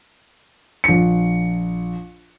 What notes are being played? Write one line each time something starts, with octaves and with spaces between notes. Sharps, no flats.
A#1 C#7